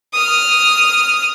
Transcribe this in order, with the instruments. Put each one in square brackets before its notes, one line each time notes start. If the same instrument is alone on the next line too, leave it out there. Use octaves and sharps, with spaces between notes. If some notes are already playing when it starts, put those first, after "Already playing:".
[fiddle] D#6 F6